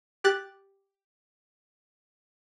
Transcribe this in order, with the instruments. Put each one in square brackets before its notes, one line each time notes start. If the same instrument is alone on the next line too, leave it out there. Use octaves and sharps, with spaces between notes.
[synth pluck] G4 F#6 A6